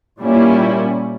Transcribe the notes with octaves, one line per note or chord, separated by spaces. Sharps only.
A#2 G3 A#3 C#4 E4